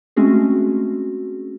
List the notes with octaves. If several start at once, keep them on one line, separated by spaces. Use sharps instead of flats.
G#3 A3 C4 C#4 F#4 G#4